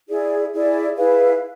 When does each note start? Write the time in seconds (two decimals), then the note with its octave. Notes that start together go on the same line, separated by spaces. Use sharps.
0.08 E4 G#4 D5
0.52 E4 G#4 D5
0.97 E4 G#4 B4 F5